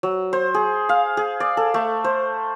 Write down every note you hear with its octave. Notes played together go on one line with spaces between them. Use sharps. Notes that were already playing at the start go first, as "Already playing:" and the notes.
F#3
C5
G#4
F5
G#4
D5
A4
A3
C5